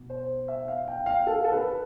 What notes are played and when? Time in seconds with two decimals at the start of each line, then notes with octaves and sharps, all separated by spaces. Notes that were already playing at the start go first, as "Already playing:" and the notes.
Already playing: B2
0.10 C5
0.48 E5
0.68 F5
0.88 G5
1.06 F5
1.27 A4
1.44 A4
1.52 B4